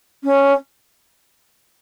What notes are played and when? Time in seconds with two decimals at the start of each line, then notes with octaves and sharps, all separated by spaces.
0.24 C#4